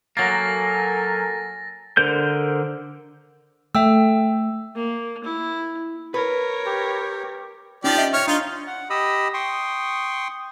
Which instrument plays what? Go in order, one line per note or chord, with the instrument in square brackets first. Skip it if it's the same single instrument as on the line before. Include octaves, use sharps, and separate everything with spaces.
[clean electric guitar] F#3 A#3 [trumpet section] A4 A#4 G#5 [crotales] A6 A#6
[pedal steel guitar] D3 A#4 C5 G6
[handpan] A3 [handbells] E5 G5 E6
[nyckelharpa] A#3
E4
[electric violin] A#4 C#5 [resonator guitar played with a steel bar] B4
[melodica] G4
[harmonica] F3 G4 D5 [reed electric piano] C#4 D#4
[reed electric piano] D#5 E5
[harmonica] C#5 F6
[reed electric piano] D4 [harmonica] D#4 F4
[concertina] F#5
G4 D#5 B5 D#6 E6
G5 C6 C#6 D#6